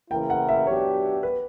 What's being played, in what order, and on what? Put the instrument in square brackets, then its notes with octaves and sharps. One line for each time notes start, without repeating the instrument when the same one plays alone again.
[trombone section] C#3 E3 A#3 E4 A#4 [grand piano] G5
[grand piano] F#5
E5
[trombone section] F#3 B3 D4 G4 [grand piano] C#5
[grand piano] B4